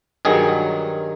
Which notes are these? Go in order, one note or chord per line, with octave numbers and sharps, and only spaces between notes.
G2 D#3 F#3 G#4